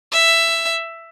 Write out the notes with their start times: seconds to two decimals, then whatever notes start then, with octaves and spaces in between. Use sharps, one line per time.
0.12 E5